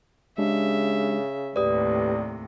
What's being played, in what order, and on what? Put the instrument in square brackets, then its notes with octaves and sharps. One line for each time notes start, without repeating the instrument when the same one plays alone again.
[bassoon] C#3 [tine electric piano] G#3 D4 G4 [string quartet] E5
[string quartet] D#2 A2 C3 [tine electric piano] G4 B4 [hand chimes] D5 D#6